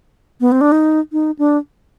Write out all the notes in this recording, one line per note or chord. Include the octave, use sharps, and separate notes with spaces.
B3
C4
D4
D#4
D#4
D4